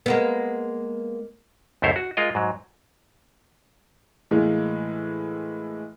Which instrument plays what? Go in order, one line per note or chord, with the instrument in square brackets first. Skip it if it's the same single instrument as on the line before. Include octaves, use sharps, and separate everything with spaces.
[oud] G#3 A#3 B3
[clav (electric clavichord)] C#2 F#2 A3 E4 C5 C#5
F#4
G#3 F4 A#4 D#5
G#2 F#3
[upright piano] A2 E3 G#3 A#3